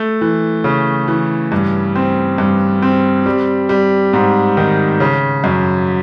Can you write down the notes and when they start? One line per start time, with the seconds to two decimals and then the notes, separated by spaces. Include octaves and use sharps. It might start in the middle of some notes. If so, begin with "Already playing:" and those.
Already playing: A3
0.21 E3
0.64 C#3
1.08 E3
1.52 G2
1.95 C4
2.38 G2
2.82 C4
3.26 G3
3.69 G3
4.13 G#2
4.57 D#3
5.00 C#3
5.44 F#2